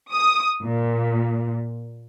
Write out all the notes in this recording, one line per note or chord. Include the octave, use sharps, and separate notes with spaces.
D#6
A#2